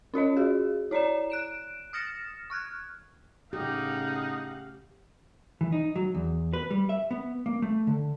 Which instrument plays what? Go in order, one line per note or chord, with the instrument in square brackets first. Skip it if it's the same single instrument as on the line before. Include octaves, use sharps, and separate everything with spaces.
[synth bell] C#4 F4 C#5 D#5
F#4 G#4
E4 C#5 D5 A#5 E7
F#6 D7 E7
D#6 F6 A6 A#6 C#7 E7
C#6 F6 F#6 G#6
[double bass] A2 C#3 [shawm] D#4 [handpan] G4 [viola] F5 F#5
[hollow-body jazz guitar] E3
D#4
F#3
E2
B4
G3
E5
B3
A#3
A3
D3